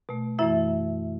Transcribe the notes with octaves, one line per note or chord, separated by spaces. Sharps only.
B2 A3
F#2 E3 A3 E4 E5